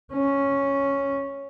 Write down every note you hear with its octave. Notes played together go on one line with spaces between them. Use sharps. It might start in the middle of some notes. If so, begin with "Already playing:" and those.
C#4